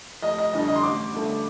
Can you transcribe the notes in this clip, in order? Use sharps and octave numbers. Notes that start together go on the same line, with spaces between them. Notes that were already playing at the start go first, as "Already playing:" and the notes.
F1 D#5
D#5
F2 D3 G3 D#5
D#5
C6
A1 D6
G2 D3 A3